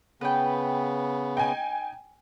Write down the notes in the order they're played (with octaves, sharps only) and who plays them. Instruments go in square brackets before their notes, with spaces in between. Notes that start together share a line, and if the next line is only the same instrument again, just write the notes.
[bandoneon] C#3 B3 [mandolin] B4 G5
[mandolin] D#4 [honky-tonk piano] G5 G#5